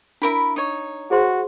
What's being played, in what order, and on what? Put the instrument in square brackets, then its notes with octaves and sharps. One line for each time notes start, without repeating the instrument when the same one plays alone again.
[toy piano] D4 [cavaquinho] E4 A#4 B5
[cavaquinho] D#4 C#5
[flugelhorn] F#4 [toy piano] G#4 C5 C6